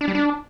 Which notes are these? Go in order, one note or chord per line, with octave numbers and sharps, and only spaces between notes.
D4
G3
D4